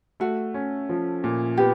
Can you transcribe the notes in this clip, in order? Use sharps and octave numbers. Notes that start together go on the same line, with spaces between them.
A3 F#4
C#4
F3
A#2
B3 G4